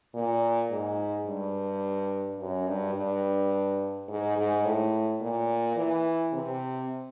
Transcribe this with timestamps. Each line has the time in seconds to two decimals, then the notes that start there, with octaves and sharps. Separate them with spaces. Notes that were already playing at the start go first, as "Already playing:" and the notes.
0.14 A#2
0.71 G#2
1.26 G2
2.39 F#2
2.68 G2
2.95 G2
4.08 G#2
4.37 G#2
4.65 A2
5.21 A#2
5.77 E3
6.33 C3